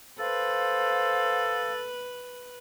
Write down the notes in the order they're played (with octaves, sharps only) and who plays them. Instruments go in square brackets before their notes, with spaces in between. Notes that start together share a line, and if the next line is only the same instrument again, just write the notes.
[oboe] A4 [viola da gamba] B4 [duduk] C5 [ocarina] F5